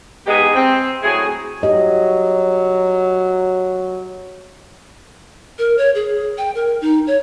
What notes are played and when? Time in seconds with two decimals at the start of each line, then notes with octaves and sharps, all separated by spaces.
0.27 E2 G#2 G#3 B3 G4 G#4
0.55 C4
1.03 A2 F#3 E4 G#4
1.63 F#3 G4 D#5
5.59 A#4
5.78 C#5
5.95 G#4
6.38 G5
6.55 A#4
6.81 D#4
7.07 C#5